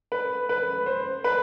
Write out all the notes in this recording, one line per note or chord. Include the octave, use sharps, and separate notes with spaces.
B4
B4
C5
B4